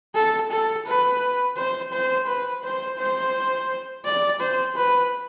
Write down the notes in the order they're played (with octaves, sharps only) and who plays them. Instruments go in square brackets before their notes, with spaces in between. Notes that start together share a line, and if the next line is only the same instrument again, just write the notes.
[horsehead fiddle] A4
A4
B4
C5
C5
B4
C5
C5
D5
C5
B4